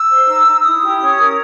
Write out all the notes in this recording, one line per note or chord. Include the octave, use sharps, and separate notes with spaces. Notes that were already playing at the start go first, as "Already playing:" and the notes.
Already playing: E6
C5
D#4
D#4
E4 D#6
G4
C#4
A#4